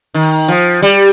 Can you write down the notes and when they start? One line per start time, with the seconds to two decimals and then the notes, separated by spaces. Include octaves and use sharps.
0.14 D#3
0.48 F3
0.82 G3